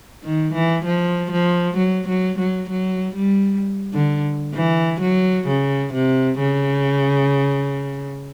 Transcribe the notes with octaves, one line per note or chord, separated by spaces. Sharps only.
D#3
E3
F3
F3
F#3
F#3
F#3
F#3
G3
D3
E3
F#3
C#3
C3
C#3